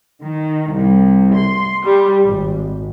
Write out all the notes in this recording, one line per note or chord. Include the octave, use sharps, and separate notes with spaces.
D#3
C2
C6
G3
G#1